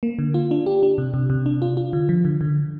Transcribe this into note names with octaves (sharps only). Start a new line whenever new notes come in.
A#3
D3
F4
D4
G4
D4
C3
C3
C3
D4
F4
F4
D3
F3
D3
D3